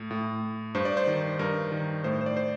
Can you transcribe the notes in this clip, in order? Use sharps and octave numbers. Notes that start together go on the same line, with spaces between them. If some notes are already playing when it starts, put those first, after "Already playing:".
Already playing: A2
A2
G2 C5
D5
C5
D#3
G2 A#4
D#3
A2 C5
C5
D5
C5